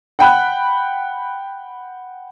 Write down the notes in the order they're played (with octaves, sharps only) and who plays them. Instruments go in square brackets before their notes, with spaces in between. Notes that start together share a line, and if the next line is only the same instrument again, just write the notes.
[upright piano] F#5 G5 B5 F#6